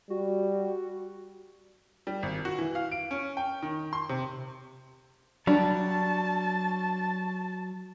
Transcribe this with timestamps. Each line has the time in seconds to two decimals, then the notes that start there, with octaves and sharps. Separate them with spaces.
0.10 G3 F#4
2.07 G3
2.23 G#1
2.45 F#4
2.58 E3
2.75 F5
2.92 D7
3.11 C#4
3.37 G5
3.62 D#3
3.93 C6
4.09 C3
5.47 F#3 G3 D4 A5